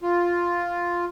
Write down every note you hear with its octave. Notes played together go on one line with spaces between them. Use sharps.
F4